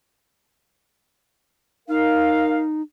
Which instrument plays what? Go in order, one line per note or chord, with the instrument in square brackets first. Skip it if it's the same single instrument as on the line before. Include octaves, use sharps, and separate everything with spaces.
[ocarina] D#4 [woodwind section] A#4 F5